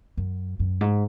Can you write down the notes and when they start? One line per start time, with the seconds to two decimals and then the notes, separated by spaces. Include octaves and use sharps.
0.17 F#2
0.59 F#2
0.81 G#2